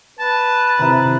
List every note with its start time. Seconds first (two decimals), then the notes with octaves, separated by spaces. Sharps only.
0.19 B4 A5
0.79 C3 D#3 E4 A#5